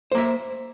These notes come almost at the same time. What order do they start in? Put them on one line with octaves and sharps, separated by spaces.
C5 A#3 E5